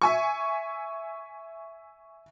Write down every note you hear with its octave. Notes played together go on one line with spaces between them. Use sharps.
E5 G#5 C#6